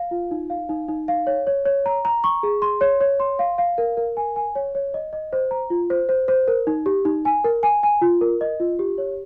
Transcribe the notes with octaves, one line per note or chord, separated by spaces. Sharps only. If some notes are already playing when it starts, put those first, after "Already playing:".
Already playing: F5
F4
D#4
F5
D#4
D#4
F5
C#5
C#5
C#5
A#5
A#5
C#6
G#4
C6
C#5
C#5
C6
F5
F5
A#4
A#4
G#5
G#5
C#5
C#5
D#5
D#5
C5
A#5
F4
C5
C5
C5
A#4
D#4
G4
D#4
G#5
A#4
G#5
G#5
F4
A#4
D#5
F4
G4
C#5